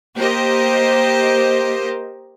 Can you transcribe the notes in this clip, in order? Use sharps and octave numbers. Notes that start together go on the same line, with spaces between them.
A#3 G4 A#4 C5 D#5